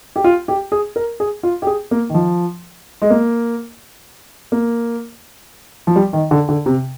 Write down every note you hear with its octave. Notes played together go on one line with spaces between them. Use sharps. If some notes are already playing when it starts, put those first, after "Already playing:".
G4
F4
G4
G#4
A#4
G#4
F4
G4
G#4
A#3
D#3
F3
G#3
A#3
A#3
F3
G3
D#3
D3
D3
C3